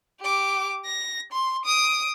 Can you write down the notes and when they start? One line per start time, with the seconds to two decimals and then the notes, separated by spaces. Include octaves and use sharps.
0.21 G4 D6
0.86 A#6
1.32 C6
1.65 D#6 D7